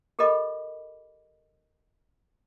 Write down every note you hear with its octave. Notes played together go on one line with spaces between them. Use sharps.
G4 A4 A#4 D#5 B5 D6